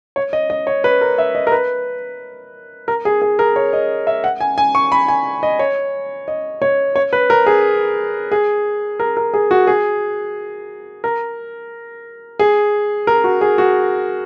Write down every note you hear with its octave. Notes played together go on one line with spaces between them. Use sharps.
C#5
D#5
D#5
C#5
B4
A#4
E5
D#5
A#4
B4
A#4
G#4
G#4
A#4
C#5
D#5
E5
F#5
G#5
G#5
C#6
B5
G#5
D#5
C#5
D#5
C#5
C#5
B4
A#4
G#4
G#4
A#4
A#4
G#4
F#4
G#4
A#4
G#4
A#4
F#4
G#4
F#4